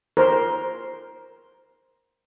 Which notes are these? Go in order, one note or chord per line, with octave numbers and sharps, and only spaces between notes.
A#4 C5